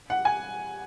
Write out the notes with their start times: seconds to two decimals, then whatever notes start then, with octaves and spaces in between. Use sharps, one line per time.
0.10 F#5
0.25 G#5